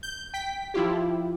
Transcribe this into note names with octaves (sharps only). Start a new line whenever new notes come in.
G6
G5 B6
F3 E4 F4 G4